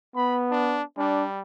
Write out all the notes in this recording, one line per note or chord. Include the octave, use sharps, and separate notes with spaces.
B3 B5
D4
G3 D4